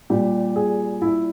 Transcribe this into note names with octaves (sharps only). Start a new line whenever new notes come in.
A#2 G3 G4
G#4
E4